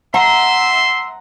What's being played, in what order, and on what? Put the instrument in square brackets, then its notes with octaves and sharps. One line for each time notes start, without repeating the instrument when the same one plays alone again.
[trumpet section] E5 C6 [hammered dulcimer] F#5 A#5